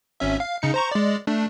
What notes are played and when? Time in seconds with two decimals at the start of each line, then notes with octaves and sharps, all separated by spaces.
0.20 G#1 C#4 E5
0.40 F5
0.62 C#3 D#4 C#7
0.74 C5 A#5 C#6
0.92 G#3 D5
1.27 A3 D4